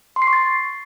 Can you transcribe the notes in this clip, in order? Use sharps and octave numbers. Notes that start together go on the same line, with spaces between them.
C6
C7
C#6
A6